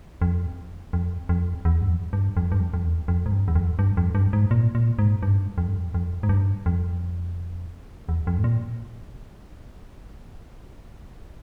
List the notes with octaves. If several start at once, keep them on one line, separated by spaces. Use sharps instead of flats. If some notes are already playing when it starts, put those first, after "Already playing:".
F2
F2
F2
E2
G2
F2
G2
F2
G2
F2
F2
E2
F2
G#2
G2
E2
F2
G2
F2
G2
G#2
A#2
A#2
G#2
G2
F2
G2
F2
F2
G#2
G2
F2
E2
F2
G#2
A#2